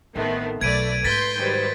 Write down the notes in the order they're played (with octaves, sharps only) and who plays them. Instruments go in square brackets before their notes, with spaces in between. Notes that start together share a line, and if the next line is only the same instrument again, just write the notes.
[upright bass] A1 [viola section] D#3 B3 C4 [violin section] A3
[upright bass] B1 B2 [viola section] A3 [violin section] B4 D5 [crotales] G#6 D7 D#7
[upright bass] G#2 [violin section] B4 C6 G6 [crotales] A6 B6 D7
[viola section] D#3 F#3 G3 [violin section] B4 C5